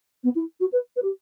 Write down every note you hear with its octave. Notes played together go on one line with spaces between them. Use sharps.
B3
E4
F#4
B4
B4
G4